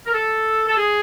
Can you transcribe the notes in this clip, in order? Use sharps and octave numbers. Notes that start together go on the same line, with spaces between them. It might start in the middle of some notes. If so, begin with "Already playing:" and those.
A#4
A4
A4
G#4